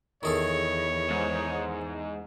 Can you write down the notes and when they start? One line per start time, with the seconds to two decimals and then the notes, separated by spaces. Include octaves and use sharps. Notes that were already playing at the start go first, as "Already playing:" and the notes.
0.23 E2 D#3 G#4 A4 C#5
1.10 G#2